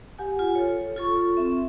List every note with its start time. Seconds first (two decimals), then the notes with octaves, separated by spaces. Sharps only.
0.18 G4 F#5 G#5
0.39 F4
0.55 A4 C#5
0.96 F4 A4 C#6
1.37 C4 E5